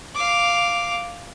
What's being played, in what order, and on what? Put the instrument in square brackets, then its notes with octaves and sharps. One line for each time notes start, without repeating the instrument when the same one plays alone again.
[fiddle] F5 D6